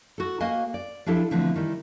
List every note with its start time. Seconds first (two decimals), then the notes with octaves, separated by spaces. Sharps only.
0.18 F#4 A4
0.40 A#3 F#4 B4 D#5 F5 G#5
0.74 D5
1.06 F3 D4 E4 G4 A4
1.31 D3 E3 F3 A3 B3 C4
1.56 D#3 E3 G3